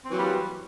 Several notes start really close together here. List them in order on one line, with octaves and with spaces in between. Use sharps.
C4 E3 F#3 A#3 G3